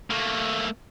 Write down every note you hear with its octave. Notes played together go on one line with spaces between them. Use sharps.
A3 A#3